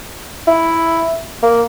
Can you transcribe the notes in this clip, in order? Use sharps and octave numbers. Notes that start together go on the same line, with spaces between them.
E4
A#3